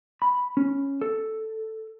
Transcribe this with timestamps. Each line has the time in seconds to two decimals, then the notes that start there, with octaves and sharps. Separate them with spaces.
0.22 B5
0.57 C#4
1.01 A4